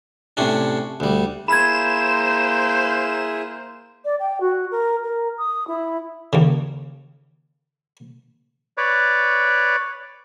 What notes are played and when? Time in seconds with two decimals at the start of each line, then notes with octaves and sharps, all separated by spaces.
0.37 A2 C3 C#4 D4
1.00 D2 G3
1.48 A#3 E4 G#4 C5 B5 G#6 E7
4.04 D5
4.19 G5
4.40 F#4
4.71 A#4
5.03 A#4
5.38 D#6
5.67 E4
6.33 D#2 C#3
8.78 B4 C#5 D5